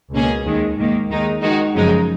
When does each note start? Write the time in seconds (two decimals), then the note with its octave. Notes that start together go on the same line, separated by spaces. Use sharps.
0.12 C#2 B2 A#3 C#4 G#4
0.45 D#2 D#3 G#3
0.77 G#2 D#3 A#3
1.09 D#2 D#3 G#3 D#4
1.42 D#3 G#3 D#4 F#4
1.74 F#2 C#3 F3 G#3 D#4